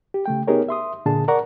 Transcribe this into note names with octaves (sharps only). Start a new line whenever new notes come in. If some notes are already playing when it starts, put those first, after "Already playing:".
G4
C#3 A3 G5
B3 D#4 G4 G#4 A#4 C#5
E5 C6 D#6
A#2 D3 D4 G#4 A5
A#4 D5 F#5 A#5 C#6